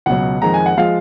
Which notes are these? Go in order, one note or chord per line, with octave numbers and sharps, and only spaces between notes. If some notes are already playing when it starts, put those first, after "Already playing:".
C#2 B2 F#3 F#5
F2 D#3 G#3 A#5
G#5
F#5
F3 G#3 F5